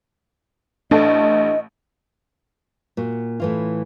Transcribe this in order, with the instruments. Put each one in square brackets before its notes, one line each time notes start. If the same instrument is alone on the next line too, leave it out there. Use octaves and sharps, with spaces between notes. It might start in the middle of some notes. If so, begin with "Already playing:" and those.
[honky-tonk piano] A1 A3 A5 [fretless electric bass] D4 [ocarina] D#5
[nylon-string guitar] A#2 F#4
A2 E3 F4